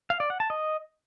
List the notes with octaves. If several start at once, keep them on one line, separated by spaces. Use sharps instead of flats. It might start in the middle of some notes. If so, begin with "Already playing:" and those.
F5
D5
F#5
A5
D#5